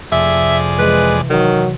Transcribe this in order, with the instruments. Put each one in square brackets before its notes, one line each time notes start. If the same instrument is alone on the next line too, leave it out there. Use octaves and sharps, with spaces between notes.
[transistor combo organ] F2 G#4 D5 [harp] C3 A3 [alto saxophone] E5
[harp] E3 [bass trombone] G#3 [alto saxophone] B4
[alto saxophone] D#3 [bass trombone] F#3